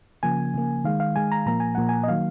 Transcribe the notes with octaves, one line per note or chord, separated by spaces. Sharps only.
C#3 F3 A#3 G#5
C#3 F3 A#3
D#3 G#3 F5
F5
D#3 G#3 G#5
A#5
A#2 F3 A#3 A#5
G#5
A#2 F3 A#3 F#5
G#5
D#5
D#3 F#3 A#3 F5